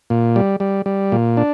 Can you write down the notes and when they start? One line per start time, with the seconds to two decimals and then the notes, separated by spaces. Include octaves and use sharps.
0.10 A#2
0.36 G3
0.60 G3
0.86 G3
1.12 A#2
1.37 D4